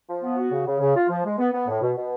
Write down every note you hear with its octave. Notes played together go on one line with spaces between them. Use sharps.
F3
B3
F#4
C#3
C#3
C#3
F4
F3
G#3
B3
B3
A2
B2
B2